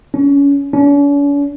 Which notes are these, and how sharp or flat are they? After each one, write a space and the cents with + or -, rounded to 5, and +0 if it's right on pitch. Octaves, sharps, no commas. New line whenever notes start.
C#4 +25
C#4 +45